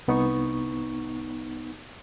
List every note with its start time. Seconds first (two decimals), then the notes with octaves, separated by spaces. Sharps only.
0.08 C2 B3 D#4 C#6